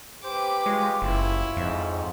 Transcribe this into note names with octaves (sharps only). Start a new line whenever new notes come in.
G4 B4 C5 D6
G#3 F4 C#5
F#1 E4
F2 G#2